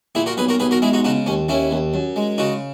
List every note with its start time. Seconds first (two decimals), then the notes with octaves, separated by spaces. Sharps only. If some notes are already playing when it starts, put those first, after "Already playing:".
0.15 A#2 E4 G#4
0.26 F#4 A#4
0.37 B1 G#4 B4
0.49 F#4 A#4
0.60 B1 G#4 B4
0.71 F#4 A#4
0.82 G#3 E4 G#4
0.93 D#4 F#4
1.04 C#3 D#4 F#4
1.26 D#2 C#4
1.48 D#2 C#4 E4
1.71 D#2
1.94 F#2
2.16 G#3
2.38 C#3 D#4 F#4